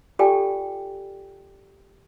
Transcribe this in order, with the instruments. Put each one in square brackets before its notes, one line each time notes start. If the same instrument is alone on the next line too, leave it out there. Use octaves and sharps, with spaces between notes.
[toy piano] F4 G4 A4 D5 G5 G#5